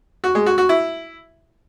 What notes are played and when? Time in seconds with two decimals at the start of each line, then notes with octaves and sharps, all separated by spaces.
0.24 F#4
0.35 G#3
0.46 F#4
0.58 F#4
0.69 E4